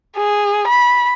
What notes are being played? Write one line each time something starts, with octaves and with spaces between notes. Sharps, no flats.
G#4
B5